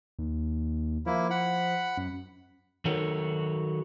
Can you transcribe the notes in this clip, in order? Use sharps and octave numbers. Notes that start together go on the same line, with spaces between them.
D#2
F3 A#3 E4
F#5 B5
F#2
D#3 F#3 F#4 A4 C#5